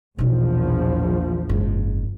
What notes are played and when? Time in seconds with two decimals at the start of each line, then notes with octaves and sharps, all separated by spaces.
0.18 A#1 E2 B2 F3 D#4
1.49 F#1 G#2